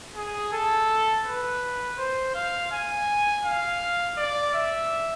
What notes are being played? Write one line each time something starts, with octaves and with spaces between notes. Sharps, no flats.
G#4
A4
B4
C5
F5
G#5
F5
D5
E5